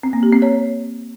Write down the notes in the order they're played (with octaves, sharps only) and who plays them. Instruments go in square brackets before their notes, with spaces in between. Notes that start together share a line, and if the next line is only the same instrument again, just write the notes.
[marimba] C4
A#3
G4
C4
C#5